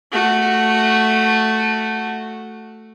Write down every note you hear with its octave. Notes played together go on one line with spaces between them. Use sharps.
A3 F#4